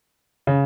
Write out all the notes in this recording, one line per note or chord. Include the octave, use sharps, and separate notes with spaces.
C#3